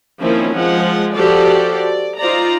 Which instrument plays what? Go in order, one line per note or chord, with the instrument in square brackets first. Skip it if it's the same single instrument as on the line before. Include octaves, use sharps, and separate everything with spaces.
[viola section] D#3 F3 A#3 C4 C#4 E4
F3 G#3 F#5
F3 F#4 G4 A4 D5
D5
D#4 F4 C5 D5 A#5